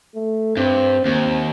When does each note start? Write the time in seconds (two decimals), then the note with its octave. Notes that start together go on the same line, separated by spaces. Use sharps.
0.15 A3
0.57 G2 C4
1.05 D#2 C4